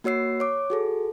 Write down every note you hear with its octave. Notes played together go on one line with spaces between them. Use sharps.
A#3 F#4 C#5 E6 C7
C#5 D6
F#4 G#4 A4